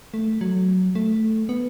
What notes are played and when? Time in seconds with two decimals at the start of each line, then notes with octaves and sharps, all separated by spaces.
0.14 A3
0.41 F#3
0.95 A3
1.49 B3